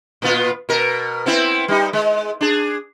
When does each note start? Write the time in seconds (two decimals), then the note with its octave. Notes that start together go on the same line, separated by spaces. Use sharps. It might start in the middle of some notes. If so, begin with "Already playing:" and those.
0.22 A#2 B3 F4
0.69 B2 A#4
1.26 B3 C4 E4
1.68 G3 D#4
1.93 G#3
2.41 D4 G#4